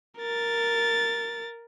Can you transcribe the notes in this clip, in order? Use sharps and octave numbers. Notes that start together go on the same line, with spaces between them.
A#4 A6